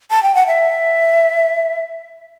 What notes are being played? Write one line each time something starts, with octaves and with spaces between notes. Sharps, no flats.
A5
G5
F#5
E5